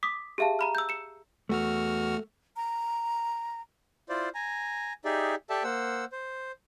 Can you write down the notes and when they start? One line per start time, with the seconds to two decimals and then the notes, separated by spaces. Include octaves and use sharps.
0.03 D6 D#6 B6
0.38 G4 G#4 E5 F5 A5
0.59 A#5 B5 F6
0.75 E6 G6
0.89 C#7 E7
1.49 E2 A3 F#4 F6
2.56 A#5
4.09 E4 F4 C5 D5
4.35 G#5 A#5
5.05 D#4 G4 G#4 D5 E5
5.50 G4 A4 D5 E5 G5 A5
5.64 A#3 C5 F#5 E6
6.12 C5